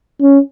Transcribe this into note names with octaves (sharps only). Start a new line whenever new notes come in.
C#4